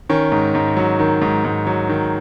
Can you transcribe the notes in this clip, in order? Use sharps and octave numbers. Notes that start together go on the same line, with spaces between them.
D#3 C#4
G#2
G#2
F#3
D#3
G#2
G#2
F#3
D#3